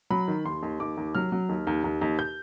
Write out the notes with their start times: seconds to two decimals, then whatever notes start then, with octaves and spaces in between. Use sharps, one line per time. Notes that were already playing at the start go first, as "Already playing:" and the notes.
0.10 F#3 B5
0.28 D#3
0.45 D#2 C6
0.63 D#2
0.80 D#2 D6
0.97 D#2
1.15 F#3 F6
1.32 F#3
1.49 D#2
1.67 D#2
1.84 D#2
2.01 D#2
2.19 G6